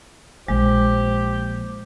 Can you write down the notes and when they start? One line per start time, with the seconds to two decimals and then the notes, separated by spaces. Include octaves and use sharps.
0.48 A#1 G#3 A#3 G4 C5